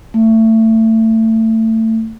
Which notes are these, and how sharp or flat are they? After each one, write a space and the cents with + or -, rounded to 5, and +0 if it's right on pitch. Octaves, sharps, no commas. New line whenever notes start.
A3 +25